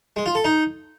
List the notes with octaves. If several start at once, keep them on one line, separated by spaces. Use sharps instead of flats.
G#3
F4
A4
D#4